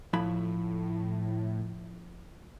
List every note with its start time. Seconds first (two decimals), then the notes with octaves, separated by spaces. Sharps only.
0.13 A2 F3 E4 B5